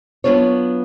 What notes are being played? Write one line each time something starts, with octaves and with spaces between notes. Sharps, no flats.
F#3 B3 D4 F4 C#5